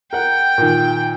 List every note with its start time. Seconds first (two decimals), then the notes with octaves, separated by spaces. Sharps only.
0.13 A#4 F#5 G5
0.58 A#2 D#3